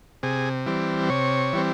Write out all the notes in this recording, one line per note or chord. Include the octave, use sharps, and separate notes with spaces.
C3 G#4
E3 G3 C4
C3 C#5
E3 G3 C4